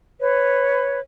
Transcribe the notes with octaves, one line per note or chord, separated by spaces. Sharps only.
B4 C#5